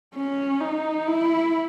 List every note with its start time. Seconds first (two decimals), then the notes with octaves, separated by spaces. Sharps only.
0.15 C#4
0.61 D#4
1.08 E4